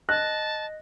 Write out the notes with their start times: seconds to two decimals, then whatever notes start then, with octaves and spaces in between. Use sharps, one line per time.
0.09 D#5 A5 F#6 A#6